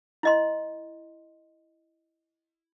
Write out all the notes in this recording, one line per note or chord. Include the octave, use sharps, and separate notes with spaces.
E4 D#5 C6